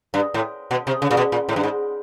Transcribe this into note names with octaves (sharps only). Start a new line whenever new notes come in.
G2
A2
B2
C3
C#3
A#2
B2
A#2
A2
G2
G#2